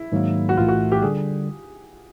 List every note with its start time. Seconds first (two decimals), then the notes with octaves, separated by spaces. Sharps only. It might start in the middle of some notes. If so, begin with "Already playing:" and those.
Already playing: E4
0.12 G#2 D#3 F#3 A#3
0.49 F#4
0.57 B1 A2 E3 A3 F4
0.68 F#4
0.92 G4
1.02 D3 G3 G#4